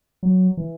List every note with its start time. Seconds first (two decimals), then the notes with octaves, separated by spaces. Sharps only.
0.23 F#3
0.57 E3